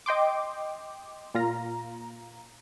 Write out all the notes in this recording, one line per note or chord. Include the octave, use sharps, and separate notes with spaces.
D#5 G5 C6 D6
A#2 F4 A#5